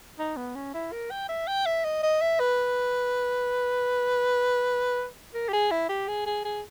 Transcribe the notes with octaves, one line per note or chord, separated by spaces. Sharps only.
D#4
B3
C#4
E4
A#4
G5
E5
G5
E5
D#5
D#5
E5
B4
A#4
G4
G#4
E4
G4
G#4
G#4
G#4